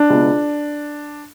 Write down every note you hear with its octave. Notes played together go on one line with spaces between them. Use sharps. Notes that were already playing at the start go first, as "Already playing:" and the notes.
Already playing: D4
C#2 B2